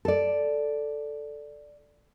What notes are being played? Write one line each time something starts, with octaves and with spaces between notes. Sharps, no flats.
A4 D5